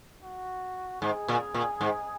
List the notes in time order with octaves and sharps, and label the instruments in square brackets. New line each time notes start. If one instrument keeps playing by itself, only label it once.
[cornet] F#4
[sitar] G#2 [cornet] G#4
[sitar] A#2
A#2
G#2